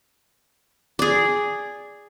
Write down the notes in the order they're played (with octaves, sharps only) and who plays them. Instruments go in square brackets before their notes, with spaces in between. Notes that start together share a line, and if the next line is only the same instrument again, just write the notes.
[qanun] G#4 D5